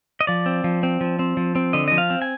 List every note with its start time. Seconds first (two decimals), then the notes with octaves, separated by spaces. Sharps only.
0.21 D#5
0.27 F3 D5
0.46 C4
0.64 F3
0.83 C4
1.01 F3
1.19 C4
1.37 F3
1.55 C4
1.73 D3 D#5
1.88 F3 D#5
1.98 F5
2.10 C4
2.22 G#5